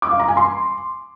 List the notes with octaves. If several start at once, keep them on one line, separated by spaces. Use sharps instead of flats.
D6
F5
A#5
G#5
C6